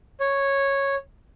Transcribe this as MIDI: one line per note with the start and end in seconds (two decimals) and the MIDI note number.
0.21 0.95 73